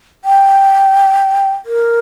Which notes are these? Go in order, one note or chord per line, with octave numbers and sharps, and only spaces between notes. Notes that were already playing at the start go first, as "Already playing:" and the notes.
G5
A#4